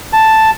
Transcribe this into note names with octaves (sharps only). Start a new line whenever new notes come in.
A5